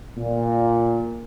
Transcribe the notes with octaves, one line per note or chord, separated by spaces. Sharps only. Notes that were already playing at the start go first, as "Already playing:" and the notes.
A#2